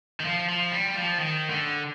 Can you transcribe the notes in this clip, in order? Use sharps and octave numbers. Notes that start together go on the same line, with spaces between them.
D#3
F3
F3
G3
F3
D#3
D3